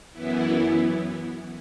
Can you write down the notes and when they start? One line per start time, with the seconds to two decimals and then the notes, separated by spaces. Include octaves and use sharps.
0.11 F#2 E3 B3 E4